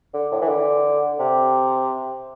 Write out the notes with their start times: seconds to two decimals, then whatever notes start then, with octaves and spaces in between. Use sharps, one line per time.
0.14 D3
0.32 A2
0.41 E3
0.49 D3
1.19 C3